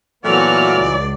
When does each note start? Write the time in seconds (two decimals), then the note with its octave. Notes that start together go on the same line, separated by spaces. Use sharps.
0.25 A#2 E3 F#3 A3 B3 F#4 D5 F6
0.76 C#2